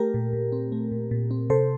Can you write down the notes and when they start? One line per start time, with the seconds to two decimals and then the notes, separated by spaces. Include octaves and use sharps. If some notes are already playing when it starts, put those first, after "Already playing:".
Already playing: A3 G4 A#4
0.14 A#2
0.33 A#2
0.52 C4
0.72 A3
0.92 A#2
1.11 A#2
1.31 C4
1.50 C3 A4 C5